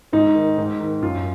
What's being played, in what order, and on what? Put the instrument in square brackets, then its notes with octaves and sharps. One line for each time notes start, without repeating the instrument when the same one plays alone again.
[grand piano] G#2 D#4
D#3
G#2
D#3
F#2 F4